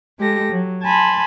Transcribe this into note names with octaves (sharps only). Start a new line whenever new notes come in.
G#3 G4 A4 A#6
F#3
G#5 A5 B5 C6